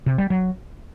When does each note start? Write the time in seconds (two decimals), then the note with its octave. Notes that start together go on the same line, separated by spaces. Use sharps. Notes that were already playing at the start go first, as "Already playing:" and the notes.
0.06 C3
0.18 G3
0.30 F#3